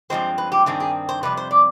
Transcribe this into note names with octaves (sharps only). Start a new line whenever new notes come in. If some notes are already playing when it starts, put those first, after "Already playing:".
G2 F3 G#3 C4 C5
B4
G4
G2 D#3 G3 C4 G#4
G#4
C5
F2 C3 G3 B4
C5
D5